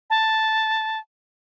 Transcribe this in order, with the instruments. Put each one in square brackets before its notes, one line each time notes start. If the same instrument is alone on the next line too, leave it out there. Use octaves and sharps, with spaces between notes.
[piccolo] A5